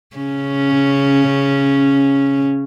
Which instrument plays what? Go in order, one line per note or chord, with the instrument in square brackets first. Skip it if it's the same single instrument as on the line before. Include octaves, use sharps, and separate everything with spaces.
[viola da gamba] C#3 C#4